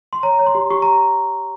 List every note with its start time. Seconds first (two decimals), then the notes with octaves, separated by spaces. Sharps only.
0.13 C6
0.23 C#5 A#5
0.39 C#5
0.46 C6
0.55 G4
0.70 G4 C#6
0.82 A#5